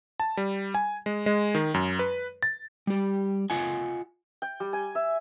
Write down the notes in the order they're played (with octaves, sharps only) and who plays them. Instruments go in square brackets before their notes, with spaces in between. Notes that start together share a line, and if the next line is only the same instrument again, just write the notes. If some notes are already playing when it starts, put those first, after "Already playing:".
[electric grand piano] A5
G3
G#5
G#3
G#3
D#3
F#2
B4
A6
[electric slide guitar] G3 G4
F4 D#5 F#5 G#5
[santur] G5
G3
G#5
E5